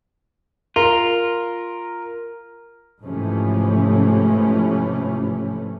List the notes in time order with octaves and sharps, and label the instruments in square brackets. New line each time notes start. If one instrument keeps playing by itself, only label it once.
[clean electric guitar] F4 [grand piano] A#4
[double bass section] G#2 C3 E3 F3 A3 C#4